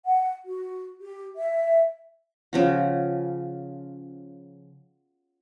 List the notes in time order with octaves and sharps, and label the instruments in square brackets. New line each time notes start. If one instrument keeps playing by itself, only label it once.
[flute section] F#5
F#4
G4
E5
[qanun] C#3 F3 F#4